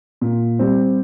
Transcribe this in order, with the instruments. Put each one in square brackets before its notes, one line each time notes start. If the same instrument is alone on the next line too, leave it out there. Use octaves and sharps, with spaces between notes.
[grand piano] A#2
G3 C4